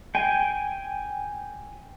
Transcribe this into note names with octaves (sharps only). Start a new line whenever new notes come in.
G5 G#5